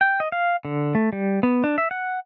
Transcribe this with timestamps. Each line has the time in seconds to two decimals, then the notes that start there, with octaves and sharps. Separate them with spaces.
0.01 G5
0.20 D#5
0.32 F5
0.65 D3
0.95 A3
1.13 G3
1.43 B3
1.64 D4
1.78 E5
1.91 F#5